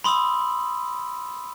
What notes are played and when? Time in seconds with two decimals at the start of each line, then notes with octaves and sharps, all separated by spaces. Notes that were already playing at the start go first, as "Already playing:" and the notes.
0.04 B5 C6 D#6 E6 F#7